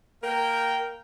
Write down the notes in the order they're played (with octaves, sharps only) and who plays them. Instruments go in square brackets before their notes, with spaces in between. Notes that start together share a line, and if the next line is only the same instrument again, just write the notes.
[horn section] A#3 A#4 G5